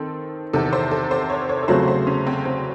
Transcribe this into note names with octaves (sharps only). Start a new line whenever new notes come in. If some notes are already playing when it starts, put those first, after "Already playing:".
Already playing: D#3 C4 A4
E2 C3 D#3 A4
C5
A4
C5
C#5
C#5
A4
E2 C#3 F#3 A3 C4 C5
C5
C#4
C4
C4